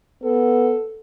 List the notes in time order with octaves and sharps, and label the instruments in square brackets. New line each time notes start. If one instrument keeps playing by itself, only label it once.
[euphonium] B3 [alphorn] A4